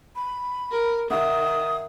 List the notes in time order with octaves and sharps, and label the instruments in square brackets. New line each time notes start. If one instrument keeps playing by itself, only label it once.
[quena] B5
[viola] A#4
[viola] D#3 [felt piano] E5 F#5 [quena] D#6